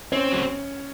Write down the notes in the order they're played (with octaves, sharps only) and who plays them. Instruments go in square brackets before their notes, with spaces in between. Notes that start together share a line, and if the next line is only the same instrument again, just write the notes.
[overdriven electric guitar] C4 [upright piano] C#4
[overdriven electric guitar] F#3